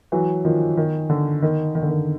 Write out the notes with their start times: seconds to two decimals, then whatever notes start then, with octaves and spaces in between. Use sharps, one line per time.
0.12 E3 F#3
0.45 D#3 F3
0.77 D#3
1.10 D3
1.42 D#3
1.75 D#3
1.82 D3
1.89 D#3